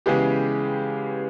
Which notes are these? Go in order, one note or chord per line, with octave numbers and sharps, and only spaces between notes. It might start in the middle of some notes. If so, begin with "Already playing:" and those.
C#3 E3 G#3 B3 G4